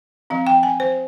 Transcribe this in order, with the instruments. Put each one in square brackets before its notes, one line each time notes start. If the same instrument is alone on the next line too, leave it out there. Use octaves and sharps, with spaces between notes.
[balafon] F3 C4 F5
G5
G#5
C5